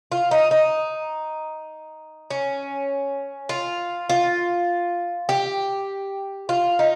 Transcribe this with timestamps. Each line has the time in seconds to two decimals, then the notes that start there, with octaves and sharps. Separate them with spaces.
0.12 F4
0.31 D#4
0.51 D#4
2.30 C#4
3.49 F4
4.10 F4
5.29 G4
6.49 F4
6.79 D#4